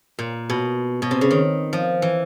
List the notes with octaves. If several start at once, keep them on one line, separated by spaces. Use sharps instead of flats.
A#2
B2
B2
C3
C#3
D#3
F3
E3